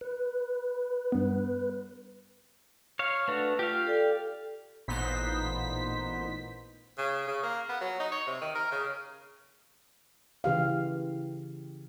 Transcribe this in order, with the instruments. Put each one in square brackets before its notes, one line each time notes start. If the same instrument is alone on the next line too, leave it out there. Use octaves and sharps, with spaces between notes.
[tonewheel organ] B4
[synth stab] G2 B3
[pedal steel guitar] C#5 F5
[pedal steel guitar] A3 D4 F#4 [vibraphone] B4
[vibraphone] F4 [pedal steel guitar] G4 F5
[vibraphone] A4 D5 G5
[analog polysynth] A1 A#2 B3 D#4 C5 B6
[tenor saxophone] C#3
C#3
A#3
B3
F#3
D#4
C#5
C3
D#3
A#4
C#3
[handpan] C#3 E3 G4 F5